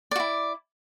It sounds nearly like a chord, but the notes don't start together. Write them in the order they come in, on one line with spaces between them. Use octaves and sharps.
D5 F#4 E4